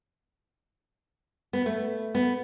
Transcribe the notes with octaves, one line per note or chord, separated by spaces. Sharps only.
B3
A3
B3